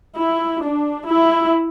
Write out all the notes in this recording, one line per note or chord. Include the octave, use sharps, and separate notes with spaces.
E4
D4
E4